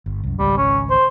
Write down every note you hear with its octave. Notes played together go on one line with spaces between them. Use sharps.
G1
C2 F#2
G#1 C#2 G3
C#4
C5